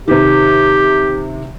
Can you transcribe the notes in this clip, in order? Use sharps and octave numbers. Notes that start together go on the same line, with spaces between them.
C3 D#3 G4